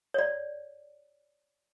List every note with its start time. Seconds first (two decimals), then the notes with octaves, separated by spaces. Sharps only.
0.14 C#5 D5